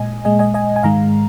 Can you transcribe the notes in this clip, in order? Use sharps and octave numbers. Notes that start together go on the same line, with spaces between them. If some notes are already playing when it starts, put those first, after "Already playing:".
Already playing: A#2 G#3 D#5 G#5
A#2 G#3 D#5 G#5
D#5 G#5
D#5 G#5
G#5
G#2 D#3 G#3 F5 A#5